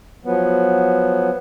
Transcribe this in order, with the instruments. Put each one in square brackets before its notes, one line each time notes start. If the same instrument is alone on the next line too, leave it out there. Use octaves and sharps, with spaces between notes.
[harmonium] F3 F#3 B3